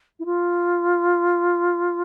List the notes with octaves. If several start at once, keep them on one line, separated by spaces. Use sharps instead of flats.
E4
F4